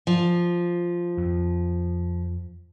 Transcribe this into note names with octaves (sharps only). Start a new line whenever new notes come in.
F3
F2